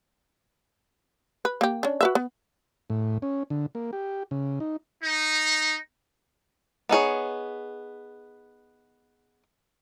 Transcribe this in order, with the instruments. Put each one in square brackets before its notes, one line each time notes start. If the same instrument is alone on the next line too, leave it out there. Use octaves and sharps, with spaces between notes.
[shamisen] B4
A#3 G4
C#4 D4
F#4 B4 E5
B3
[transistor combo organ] A2
C#4
D3
A#3
G4
C#3
D#4
[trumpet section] D#4
[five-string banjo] B3 D#4 G#4 C#5